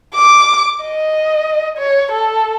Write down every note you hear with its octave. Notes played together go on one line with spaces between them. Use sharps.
D6
D#5
C#5
A4